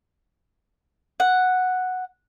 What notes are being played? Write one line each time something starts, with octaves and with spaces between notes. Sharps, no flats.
F#5